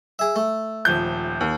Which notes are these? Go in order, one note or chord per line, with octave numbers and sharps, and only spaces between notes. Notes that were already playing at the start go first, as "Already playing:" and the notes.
G#4 E5
A3
D#1 F3 G6
D#2